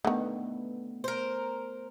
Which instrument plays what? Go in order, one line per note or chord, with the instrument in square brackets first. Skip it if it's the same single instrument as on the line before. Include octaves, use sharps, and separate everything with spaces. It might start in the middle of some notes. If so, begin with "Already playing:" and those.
[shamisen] D3 D#3 [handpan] A3 B3
[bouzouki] A#4 C5